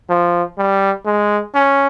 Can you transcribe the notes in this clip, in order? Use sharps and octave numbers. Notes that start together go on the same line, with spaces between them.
F3
G3
G#3
C#4